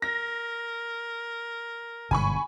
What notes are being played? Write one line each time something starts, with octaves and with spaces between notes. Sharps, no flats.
A#4 A#6
G1 G#2 B2 G#5 B5 C#6